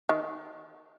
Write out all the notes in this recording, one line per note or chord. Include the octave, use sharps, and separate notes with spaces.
D#3